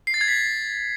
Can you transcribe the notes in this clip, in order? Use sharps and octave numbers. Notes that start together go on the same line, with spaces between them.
C7
A6
G#6
B6